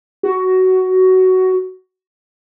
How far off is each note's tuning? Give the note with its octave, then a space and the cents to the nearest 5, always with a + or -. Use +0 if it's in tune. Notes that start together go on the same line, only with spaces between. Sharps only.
F#4 +15